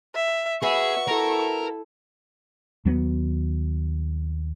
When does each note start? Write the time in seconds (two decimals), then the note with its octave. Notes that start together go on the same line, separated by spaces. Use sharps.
0.15 E5
0.62 F#4 G#4 B4 E5 C#6
1.08 E4 A4 A#4
2.85 D#2 F#3 B3